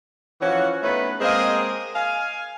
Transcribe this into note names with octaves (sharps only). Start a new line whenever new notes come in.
E3 F3 C#4 F#4
A3 B3 C#4 D#4 B4
G#3 A#3 C4 G#4 A#4 D#5
F5 G#5